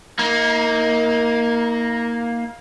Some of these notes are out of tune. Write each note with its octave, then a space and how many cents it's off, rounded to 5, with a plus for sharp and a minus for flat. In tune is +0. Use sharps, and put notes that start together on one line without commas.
A#3 +0 D#4 +35